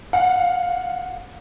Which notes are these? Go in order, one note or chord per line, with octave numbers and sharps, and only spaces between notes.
F5 F#5